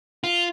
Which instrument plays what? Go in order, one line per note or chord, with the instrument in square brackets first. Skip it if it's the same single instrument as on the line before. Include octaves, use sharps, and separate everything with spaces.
[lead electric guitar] F4